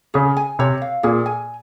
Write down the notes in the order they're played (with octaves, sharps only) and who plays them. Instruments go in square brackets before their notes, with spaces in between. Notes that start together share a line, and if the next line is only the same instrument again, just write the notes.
[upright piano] C#3 [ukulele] G#4
[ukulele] G#5
[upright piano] C3 [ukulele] C#5
[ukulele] F5
[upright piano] A#2 [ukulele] G#4
[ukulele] G#5